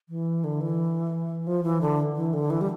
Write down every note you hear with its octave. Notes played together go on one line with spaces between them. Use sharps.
E3
D3
E3
F3
E3
D3
E3
D3
E3
G3